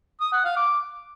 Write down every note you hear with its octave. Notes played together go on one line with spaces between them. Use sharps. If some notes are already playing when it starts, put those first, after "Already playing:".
D#6
F#5
F5
D6